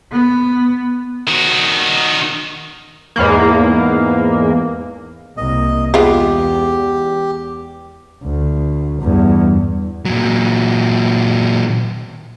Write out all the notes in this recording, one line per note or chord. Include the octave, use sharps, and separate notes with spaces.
B3
D#3 F#4
E2 G#2 E3 A#3
C2 A#3 D#5
E2 G#3 B3 F4 G4
D2
E2 G2
A#2 F#3